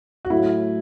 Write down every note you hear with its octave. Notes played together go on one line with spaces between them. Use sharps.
F#4
A2 F#3 A3 E4